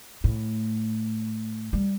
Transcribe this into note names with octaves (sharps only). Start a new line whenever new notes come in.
A2
G3